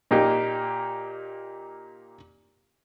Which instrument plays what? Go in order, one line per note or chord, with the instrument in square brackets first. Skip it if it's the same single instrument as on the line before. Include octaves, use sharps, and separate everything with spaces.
[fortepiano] A#2 A#3 D#4 G4